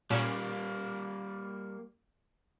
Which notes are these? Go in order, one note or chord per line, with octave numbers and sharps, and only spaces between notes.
A#2 G3 A#3 C#4 E7